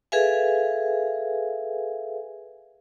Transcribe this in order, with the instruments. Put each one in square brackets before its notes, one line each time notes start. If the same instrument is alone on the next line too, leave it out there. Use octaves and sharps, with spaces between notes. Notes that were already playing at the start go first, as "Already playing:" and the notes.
[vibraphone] G#4 A4 B4 E5 F5 G#5